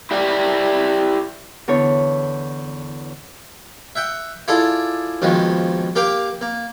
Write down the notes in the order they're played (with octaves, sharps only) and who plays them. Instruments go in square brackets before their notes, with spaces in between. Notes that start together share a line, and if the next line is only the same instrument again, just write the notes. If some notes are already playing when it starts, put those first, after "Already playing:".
[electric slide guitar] E4 G4 D5
[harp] E2 D3 C#5
[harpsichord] E5 F#5 G5
E4 F4 G#4 A4 D5
A#1 B2 D#3 F3 G#3
A#3 G4 A#4 F5 G5
A#3